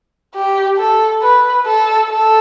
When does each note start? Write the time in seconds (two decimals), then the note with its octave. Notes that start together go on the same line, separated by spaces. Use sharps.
0.35 G4
0.78 A4
1.22 B4
1.66 A4
2.10 A4